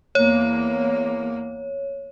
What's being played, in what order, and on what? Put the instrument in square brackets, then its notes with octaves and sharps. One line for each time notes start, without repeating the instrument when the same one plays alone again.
[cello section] E2 A#3 [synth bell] C#5